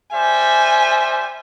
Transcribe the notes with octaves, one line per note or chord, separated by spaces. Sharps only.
G3 C5 E5 G#5